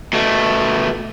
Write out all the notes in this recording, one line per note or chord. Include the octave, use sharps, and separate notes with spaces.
B2 A3